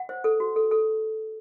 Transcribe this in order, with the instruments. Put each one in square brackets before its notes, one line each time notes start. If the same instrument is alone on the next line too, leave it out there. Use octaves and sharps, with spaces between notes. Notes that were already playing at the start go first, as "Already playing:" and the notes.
Already playing: [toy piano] F#5
C5
A4
F#4
A4
A4